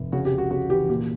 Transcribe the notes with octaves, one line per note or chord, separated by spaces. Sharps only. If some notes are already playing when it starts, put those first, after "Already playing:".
Already playing: F1
C#3 F#4
G4
C#2
F#4
C#3 F#4
E3 G4
A#2 G4